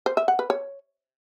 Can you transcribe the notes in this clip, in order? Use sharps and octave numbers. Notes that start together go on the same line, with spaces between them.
C5
E5
F#5
B4
C#5